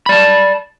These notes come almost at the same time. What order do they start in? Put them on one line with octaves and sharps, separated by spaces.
B5 D5 A5